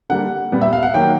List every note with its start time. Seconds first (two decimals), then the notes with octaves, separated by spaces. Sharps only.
0.09 D3 G3 A#3 F#5
0.52 A#2 G3 B3
0.61 E5
0.73 F5
0.83 F#5
0.94 D#3 F#3 A#3 G5